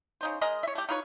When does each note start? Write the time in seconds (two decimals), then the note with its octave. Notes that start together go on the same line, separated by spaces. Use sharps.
0.21 C#3 D#4 C5
0.41 G#3 G#4 A#4 D#5
0.63 C#5 E5
0.75 A3 G4
0.89 D#4 F4 B4 C#5